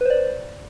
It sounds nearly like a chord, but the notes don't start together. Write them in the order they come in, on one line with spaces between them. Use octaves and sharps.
B4 C5 D5